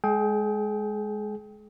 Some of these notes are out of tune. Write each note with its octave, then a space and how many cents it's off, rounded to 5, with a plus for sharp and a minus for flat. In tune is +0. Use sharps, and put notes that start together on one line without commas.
G#3 +0 G#4 +35 G5 +0